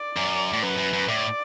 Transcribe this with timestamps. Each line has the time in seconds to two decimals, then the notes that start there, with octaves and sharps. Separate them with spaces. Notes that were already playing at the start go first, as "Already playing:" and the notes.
Already playing: D5
0.16 F#2
0.53 A2
0.63 F#2 B4
0.78 F#2
0.93 F#2
1.09 A2 D5